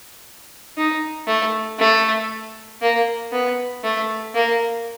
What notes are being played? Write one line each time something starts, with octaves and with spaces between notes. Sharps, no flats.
D#4
A3
A3
A#3
B3
A3
A#3